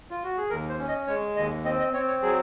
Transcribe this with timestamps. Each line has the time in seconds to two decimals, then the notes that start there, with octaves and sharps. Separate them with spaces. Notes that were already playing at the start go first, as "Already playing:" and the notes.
0.10 F4
0.24 F#4
0.37 G#4
0.50 D#2 A#4
0.69 C5
0.78 C#4
0.88 D#5
1.07 G#3 C#5
1.36 D#2 D#5
1.65 C4 D#5
1.79 D#5
1.93 C4 C#5
2.07 C#5
2.22 F#3 G#4